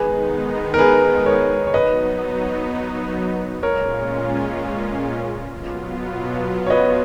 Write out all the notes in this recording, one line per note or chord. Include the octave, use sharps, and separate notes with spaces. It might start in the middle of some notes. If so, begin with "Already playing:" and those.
Already playing: D#3 G#3 B3 D#4 G#4 B4
A#4
G#4 B4
A#4 C#5
C#5
F#3 B3 D#4 B4 D#5
A#2 G#3 C#4 F4 A#4 C#5
B2 F#3 B3 F4
C#5
B4 D#5